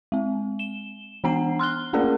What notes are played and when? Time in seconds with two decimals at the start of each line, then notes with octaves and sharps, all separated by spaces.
0.12 G#3 C4
0.59 E7 G7
1.24 E3 B3 D4 F#5 A#5 C7
1.59 C6 F6 F#6 G7
1.93 A3 A#3 C#4 G#4 A#4 D5